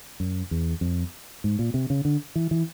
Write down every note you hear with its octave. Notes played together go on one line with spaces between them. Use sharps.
F#2
E2
F2
G#2
A#2
C3
C#3
D3
E3
E3